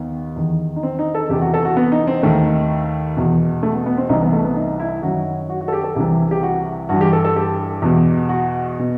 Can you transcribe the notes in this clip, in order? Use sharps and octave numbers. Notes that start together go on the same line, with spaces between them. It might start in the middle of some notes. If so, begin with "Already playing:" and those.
Already playing: D#2 D#3 B3
E2 D#3
D#4
C4
D#4
A4
E2 C3 E3 G4
F#4
A4
F#4
B3
D#4
C4
D#2 D#3 A3
E2 B2
A3
B3
B3
C4
C2 C3 E3 D#4
B3
A3
B3
D#4
E4
F#2 D#3 F#4
F#4
F#4
A4
G4
A4
C2 C3 E3 G4
G4
F#4
G2 E3 F#4
G4
A4
A4
G4
E2 B2
F#4
B2